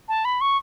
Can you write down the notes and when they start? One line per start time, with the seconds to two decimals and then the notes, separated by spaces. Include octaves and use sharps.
0.09 A5
0.25 B5
0.41 C#6